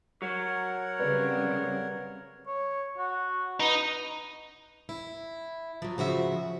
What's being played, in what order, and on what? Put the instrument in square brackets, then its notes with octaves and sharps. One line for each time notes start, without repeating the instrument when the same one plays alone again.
[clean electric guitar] F#3 [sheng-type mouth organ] A#4 C#5 F#5
[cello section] C#3 G3 C4 [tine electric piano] B4 D5
[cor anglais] C#5
F#4
[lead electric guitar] D#4 [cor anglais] B4
[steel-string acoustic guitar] E4
F3 F#3
C#3 F3 F#4 E5